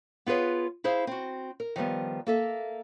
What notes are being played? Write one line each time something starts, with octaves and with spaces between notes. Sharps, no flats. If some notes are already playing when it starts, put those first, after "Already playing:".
B3 F4 G#4 B4 C#5
E4 G#4 C5 F5
C4 F#4
A#4
D#3 F3 G3 B3
A#3 A4 E5